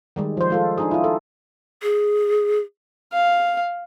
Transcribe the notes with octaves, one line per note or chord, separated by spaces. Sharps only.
D#3 G3 G#3
F3 C5
G#3 F4 A4
D4 D#4 G#4
E4 F4
A4
G#4
F5